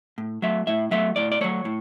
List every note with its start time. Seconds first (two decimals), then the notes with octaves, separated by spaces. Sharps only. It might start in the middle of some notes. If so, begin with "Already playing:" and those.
0.18 A2
0.42 F#3 A3 E5
0.67 A2 E5
0.91 F#3 A3 E5
1.16 A2 D5
1.32 D5
1.41 F#3 A3 C#5
1.65 A2